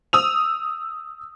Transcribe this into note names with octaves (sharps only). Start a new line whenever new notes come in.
D#6 E6 F7